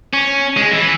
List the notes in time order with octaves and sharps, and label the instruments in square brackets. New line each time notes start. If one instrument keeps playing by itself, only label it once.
[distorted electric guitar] C#4
G#3
E3